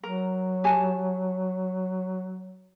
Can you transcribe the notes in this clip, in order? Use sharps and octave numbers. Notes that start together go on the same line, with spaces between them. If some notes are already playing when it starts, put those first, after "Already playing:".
F#3 A#4
G4 G#5 A5